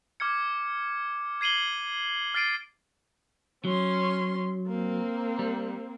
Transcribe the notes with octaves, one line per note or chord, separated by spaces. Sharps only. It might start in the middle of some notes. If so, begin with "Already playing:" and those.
D6 F6 G#6 C#7
G#6 C7 D#7 F#7 G7
F6 A6 C7 D7 D#7
F#3 C#4 C6
A#3 C4
G3